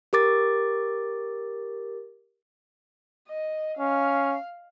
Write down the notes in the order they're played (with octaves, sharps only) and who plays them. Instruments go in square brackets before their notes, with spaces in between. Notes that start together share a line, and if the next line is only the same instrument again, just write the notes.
[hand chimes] G4 A#4 D6 A6
[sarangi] D#5
[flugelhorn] C#4 [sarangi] F5